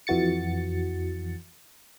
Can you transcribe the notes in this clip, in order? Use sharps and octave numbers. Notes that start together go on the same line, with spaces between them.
F2 E3 F#4 A6 C#7